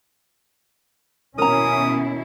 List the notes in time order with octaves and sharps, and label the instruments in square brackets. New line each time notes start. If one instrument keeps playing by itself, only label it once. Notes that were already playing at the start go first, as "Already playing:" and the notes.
[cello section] D#2 B2 E4 [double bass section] C#4 [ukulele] A#4 A#5 [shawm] D#6